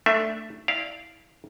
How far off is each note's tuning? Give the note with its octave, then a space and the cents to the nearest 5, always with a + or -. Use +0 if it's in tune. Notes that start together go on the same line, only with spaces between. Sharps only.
A3 +10 D4 +0 E5 +0
E4 -20 D5 +0 F5 -10